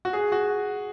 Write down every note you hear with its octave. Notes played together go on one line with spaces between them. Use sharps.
F#4
G#4
F#4